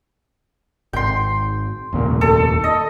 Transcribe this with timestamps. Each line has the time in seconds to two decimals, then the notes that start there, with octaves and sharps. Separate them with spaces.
0.93 G#1 G5 C6
1.93 F1 D#2 A#2
2.21 A4
2.64 D#5